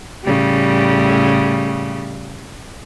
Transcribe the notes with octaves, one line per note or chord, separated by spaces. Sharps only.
A2 C#3 G3